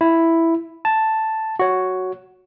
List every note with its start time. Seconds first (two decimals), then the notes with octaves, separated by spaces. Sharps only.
0.01 E4
0.85 A5
1.59 F#4 C#5